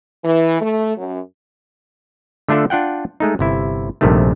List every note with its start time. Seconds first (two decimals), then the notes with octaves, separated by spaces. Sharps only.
0.23 E3
0.61 A3
0.97 F#2
2.48 D3 A3 D4 F4 A4
2.70 D4 F4 F#5 G5
3.20 G#3 A3 D#4
3.39 G1 C3 E4
4.01 A#1 G2 C3 D#3 A3